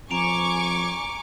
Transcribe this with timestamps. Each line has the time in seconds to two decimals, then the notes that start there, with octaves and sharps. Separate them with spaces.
0.11 F2 G#5 A#5 C#6 D6 D7 F7